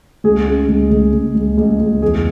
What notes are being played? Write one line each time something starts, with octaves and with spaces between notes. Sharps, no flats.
C#2 G#4
C#3
C#2
C#2
C#2
C#2
C#2
C#2
E2 G#4